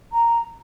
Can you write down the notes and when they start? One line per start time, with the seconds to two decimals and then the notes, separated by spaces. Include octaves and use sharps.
0.13 A#5